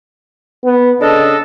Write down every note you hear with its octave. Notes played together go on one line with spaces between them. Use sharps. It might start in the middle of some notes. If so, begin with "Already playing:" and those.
B3
C#3 D4 A4 D#5